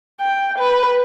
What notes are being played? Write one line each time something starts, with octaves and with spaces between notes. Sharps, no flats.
G5
B4